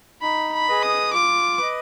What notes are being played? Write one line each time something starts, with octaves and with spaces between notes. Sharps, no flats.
D#4 B5
B5
G#4 B4 D#5
D#6
F4 D6
B4 D#5